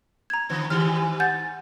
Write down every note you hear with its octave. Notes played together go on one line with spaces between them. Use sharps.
A#5 G#6
D3 F3 B3
G#2 D#3 G4 F6
F#5 G6 A6